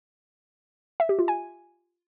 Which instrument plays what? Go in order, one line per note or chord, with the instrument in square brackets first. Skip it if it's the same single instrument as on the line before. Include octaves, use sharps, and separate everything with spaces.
[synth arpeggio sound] E5
G4
F4
G#5